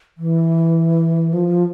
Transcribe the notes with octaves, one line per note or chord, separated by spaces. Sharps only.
E3
F3